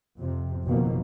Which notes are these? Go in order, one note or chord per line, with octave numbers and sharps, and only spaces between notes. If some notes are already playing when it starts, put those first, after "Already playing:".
F2 C3
F#1 F#2 B2 D#3 F3 A#3